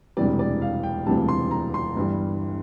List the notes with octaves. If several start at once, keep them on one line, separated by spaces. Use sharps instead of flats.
E1 D2 C3 E3 G3 D5
D5
F5
G5
E1 D2 C3 E3 G3 A5
C6
A#5
C6
G1 G2 E3 G3